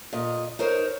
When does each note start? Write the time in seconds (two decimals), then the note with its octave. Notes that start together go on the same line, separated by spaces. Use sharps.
0.13 A#2 D#5
0.59 D#4 A#4 C5 C#5